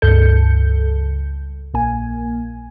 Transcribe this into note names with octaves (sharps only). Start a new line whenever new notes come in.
C#2 G2 A4 G6 C#7
A#1 A#3 G#5